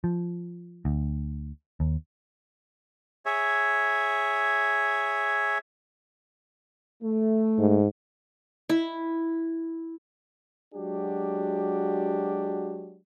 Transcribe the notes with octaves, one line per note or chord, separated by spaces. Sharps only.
F3
D2
D#2
G#4 C#5 E5
A3
G#2
E4
F#3 G#3 D4 F#4 G4